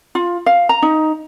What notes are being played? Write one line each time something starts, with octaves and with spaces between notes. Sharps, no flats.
F4
F5
A#5
D#4